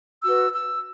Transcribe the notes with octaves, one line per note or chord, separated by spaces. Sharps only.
F#4 B4 E6
E6